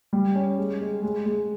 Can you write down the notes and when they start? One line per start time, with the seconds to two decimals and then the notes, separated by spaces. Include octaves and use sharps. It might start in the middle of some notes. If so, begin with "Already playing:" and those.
0.13 G3
0.35 C#4
0.58 G#3
0.81 G#3
1.03 G#3
1.26 G#3